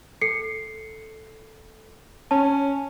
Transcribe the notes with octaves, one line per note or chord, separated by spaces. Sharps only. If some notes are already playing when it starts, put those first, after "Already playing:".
A4 C7 C#7
C#4 A5